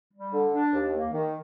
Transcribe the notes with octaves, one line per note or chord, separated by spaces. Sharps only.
G3
D3
D4
D#2
A#3
D#3